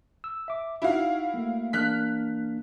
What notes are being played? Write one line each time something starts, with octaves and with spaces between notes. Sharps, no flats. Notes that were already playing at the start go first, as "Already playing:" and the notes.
E6
E5 D6
D#4 E4 F#4 F5
A3 A#3
E3 A#3 D4 F6 F#6 B6